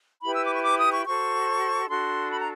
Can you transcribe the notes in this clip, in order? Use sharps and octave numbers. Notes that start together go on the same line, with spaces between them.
E4 G4 B4 B5
E6
D6
C#6
D6
D#6
C#6
F#4 A4 C5 C#6
B5
D4 F#4 A4 C6
B5
A#5